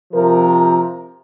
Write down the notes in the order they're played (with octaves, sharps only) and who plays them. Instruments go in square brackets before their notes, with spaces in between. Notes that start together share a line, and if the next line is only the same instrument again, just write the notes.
[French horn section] C3 F3 A#4